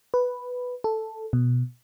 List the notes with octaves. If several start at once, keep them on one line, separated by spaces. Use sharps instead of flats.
B4
A4
B2